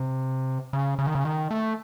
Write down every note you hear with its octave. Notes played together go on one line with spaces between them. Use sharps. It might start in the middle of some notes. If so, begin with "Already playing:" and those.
Already playing: C3
C#3
C#3
D#3
C#3
D#3
A3